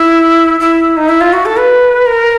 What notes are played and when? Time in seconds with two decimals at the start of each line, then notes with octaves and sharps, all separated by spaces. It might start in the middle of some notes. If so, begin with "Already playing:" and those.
Already playing: E4
0.60 E4
0.97 D#4
1.09 E4
1.21 F4
1.33 F#4
1.46 A4
1.57 B4
2.06 A#4